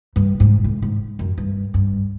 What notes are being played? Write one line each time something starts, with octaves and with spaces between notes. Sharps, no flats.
G2
G#2
A2
G#2
F#2
G2
G2